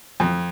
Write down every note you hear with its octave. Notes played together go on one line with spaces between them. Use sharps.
F2